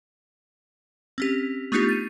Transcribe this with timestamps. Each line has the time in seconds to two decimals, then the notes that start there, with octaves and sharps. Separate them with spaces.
1.18 C4 C#4 G4
1.72 A3 B3 D4 D#4 F4 G4
1.89 A6 D#7